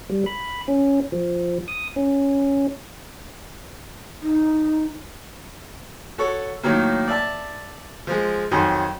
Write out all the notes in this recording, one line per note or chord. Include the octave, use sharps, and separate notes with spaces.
G3
B5
C#4
F3
D#6
C#4
D#4
F#4 A4 C#5
A2 D#3 F#3 A#3
D5 E5 A5
F3 G#3
F2 D#3 F#3 F#5 G#5 C6